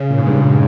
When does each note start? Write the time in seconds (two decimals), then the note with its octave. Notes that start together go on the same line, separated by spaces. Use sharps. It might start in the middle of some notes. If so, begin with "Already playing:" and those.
Already playing: C#3
0.10 A#2
0.18 G#2
0.26 G2
0.34 G#2